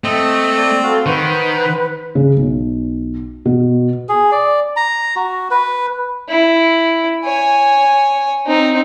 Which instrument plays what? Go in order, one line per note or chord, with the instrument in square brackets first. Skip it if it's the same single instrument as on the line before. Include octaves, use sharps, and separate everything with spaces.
[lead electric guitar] A3 [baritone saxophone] C4 [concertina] D#5
[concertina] D5
[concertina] F#4 F5 C6 [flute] A4
[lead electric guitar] D#3 [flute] B4 [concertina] C5 F#5 F#6
[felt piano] C#3
B1
B2
[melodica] G#4
D5
A#5
F#4
B4
[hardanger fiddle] E4
C#5 G#5
C4 D#4